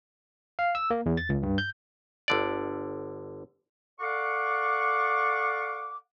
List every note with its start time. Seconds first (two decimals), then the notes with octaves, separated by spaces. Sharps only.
0.59 F5
0.75 E6
0.90 A#3
1.06 E2
1.17 A6
1.29 C#2
1.43 G2
1.58 G6
2.28 G1 D3 D5
4.00 A4 D5 F5 F#5 C#6 D6